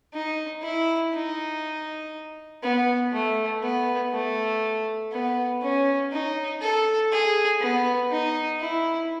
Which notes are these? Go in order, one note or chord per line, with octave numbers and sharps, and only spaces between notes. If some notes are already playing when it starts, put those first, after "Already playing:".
D#4
E4
D#4
B3
A3
B3
A3
B3
C#4
D#4
A4
G#4
B3
D#4
E4